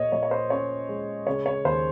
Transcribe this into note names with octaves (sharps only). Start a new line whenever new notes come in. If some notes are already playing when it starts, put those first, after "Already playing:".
Already playing: A#2 C#5 D#5
A#2 C#5
C#5
C5
C#4 C#5
G#3
C#3 C#5
C#5
D#2 C5